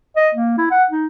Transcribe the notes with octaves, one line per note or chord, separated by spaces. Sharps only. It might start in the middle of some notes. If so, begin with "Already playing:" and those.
D#5
A#3
E4
F#5
D#4